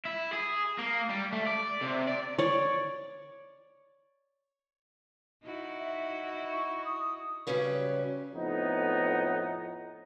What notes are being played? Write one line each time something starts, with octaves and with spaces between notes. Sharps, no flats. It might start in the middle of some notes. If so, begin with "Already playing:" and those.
E4
G#4
A#3
G3
A3
D5
C3
D5
C#5 D5
D#4 E4 F#4
E5
C#6
D#6
C#3 F#3 G3 C#4 B4
F2 A2 B3 D#4